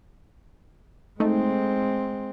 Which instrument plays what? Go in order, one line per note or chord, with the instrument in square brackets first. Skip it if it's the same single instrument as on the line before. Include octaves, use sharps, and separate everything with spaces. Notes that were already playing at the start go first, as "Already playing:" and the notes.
[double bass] G#3 C4 [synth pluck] A3 D#4